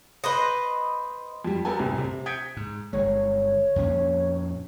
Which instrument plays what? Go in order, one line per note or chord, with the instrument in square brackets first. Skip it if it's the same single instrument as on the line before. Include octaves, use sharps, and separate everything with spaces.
[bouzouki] B4 C5 D#5
[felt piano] F2 G3
B3 F#4 A4 A#4 G5 G#5
C2 A2 C3
C3
D#6 G6 G#6 B6 C#7 D7
[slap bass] G#2
[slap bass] G1 G#3 [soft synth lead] C#5
[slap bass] F2 A#2 C#4